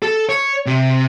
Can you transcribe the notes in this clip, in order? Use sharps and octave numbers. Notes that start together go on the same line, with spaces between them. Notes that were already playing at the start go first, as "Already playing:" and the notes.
A4
C#5
C3